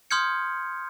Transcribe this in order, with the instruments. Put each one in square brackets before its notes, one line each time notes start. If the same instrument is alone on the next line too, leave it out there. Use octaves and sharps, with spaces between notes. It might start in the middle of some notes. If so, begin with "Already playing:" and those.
[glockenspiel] C6 D#6 F6 G6 G#6 C#7